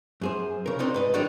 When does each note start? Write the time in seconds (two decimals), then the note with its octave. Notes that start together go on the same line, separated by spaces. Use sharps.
0.21 F#2 G#4 C5
0.66 C#3 A#4
0.79 C4 D4 D#4 C5
0.94 G#2 B4 D#5
1.14 D#3 F#3 D4 D#4 A#4